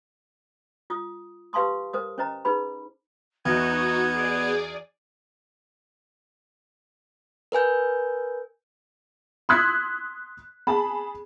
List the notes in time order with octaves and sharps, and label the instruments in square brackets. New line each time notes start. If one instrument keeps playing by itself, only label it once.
[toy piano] F4 D#6
G4 B4 F5 A5 C6 D#6
A#4 C5 D#6
C#4 C5 D#5 A#5
D#4 G#4 B4 B5
[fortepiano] E2 [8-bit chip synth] B3 [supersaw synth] D#4 F#4 [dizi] G#6
[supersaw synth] G#4 D5
[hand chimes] A#4 B4 G#5 G6
[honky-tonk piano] C6 D#6 E6 F#6 G#6 B6
G#4 A5 B5